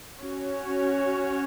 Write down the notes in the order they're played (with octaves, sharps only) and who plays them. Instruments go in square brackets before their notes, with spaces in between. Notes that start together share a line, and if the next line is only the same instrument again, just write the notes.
[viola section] C#4 F#4 C#5